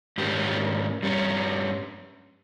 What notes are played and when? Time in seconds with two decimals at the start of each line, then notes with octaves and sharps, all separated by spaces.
0.18 G#2 D#3 A#3 C#4 G4
1.02 G2 G3 C#4